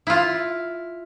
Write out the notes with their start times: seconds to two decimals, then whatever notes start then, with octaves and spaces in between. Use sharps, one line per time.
0.07 E4 F4